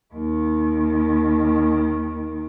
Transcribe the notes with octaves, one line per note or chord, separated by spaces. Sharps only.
D#2 D#3